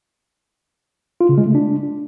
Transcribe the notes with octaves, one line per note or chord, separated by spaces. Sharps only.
F4
C#3
G#3
A3
D4